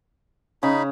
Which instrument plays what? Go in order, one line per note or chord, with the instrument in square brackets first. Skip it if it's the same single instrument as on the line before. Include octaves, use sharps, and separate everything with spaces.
[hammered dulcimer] C#3 [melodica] D#4 B5